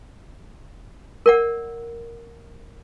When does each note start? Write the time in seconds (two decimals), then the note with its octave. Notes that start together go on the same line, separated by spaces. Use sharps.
1.26 A#4 D5 F#5